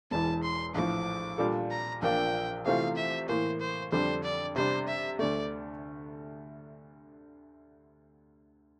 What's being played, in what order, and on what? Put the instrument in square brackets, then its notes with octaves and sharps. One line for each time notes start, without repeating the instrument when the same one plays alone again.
[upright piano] E1 E2 E3 [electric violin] A5
[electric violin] C6
[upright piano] A#1 A2 F3 [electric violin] D6
[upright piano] A#2 G3 D4 F4 A4
[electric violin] A#5
[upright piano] A#1 A#2 F3 A#3 D4 [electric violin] G5
[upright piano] C3 E3 A3 C4 F4 [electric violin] F5
[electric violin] E5
[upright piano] A2 E3 A#3 [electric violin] C5
[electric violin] C5
[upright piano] F2 D3 G3 D4 A4 [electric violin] C5
[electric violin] D5
[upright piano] C3 G3 D4 [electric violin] C5
[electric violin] E5
[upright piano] D2 D3 A3 [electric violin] D5